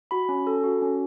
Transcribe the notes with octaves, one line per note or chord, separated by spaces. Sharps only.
F#4 B5
C#4
A4
F#4
C#4